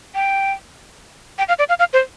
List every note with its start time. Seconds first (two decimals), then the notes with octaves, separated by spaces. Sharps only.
0.15 G5
1.38 G5
1.48 F5
1.59 D5
1.69 F5
1.79 F5
1.93 C5